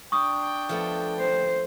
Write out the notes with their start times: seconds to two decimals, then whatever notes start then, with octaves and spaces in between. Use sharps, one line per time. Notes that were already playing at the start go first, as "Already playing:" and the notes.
0.12 D4 G5 C#6 D#6
0.69 F3 A3 B3
1.20 C5